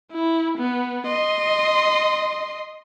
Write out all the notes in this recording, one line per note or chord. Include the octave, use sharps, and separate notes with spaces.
E4
B3
D#5 C6